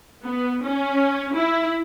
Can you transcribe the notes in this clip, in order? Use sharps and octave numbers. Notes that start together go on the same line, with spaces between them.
B3
C#4
E4